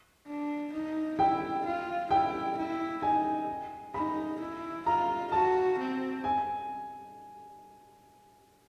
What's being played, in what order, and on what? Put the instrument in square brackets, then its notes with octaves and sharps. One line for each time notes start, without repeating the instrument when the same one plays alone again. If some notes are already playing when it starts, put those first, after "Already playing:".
[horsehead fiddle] D4
D#4
[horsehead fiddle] E4 [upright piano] G5
[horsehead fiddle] F4
[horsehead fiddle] E4 [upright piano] G5
[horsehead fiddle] E4
[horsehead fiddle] D#4 [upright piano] G#5
[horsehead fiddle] D#4 [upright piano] B5
[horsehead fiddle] E4
[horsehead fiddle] F4 [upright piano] A#5
[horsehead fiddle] F#4 [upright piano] A5
[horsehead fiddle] C4
[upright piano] G#5